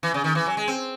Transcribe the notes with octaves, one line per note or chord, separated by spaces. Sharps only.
E3
C#3
D#3
E3
F#3
G#3
C4